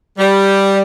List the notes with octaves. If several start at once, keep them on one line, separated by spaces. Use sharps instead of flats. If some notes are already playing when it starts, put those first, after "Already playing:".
G3